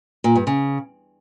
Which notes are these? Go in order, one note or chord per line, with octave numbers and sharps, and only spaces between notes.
A#2
G2
C#3